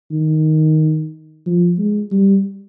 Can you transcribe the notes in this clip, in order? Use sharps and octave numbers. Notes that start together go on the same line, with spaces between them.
D#3
F3
G#3
G3